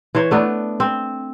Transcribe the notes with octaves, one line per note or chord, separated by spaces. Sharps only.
E3 C5 C#5
A3 B3 D4
C4